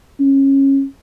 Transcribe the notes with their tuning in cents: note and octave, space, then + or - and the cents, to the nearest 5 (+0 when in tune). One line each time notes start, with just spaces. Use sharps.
C#4 -20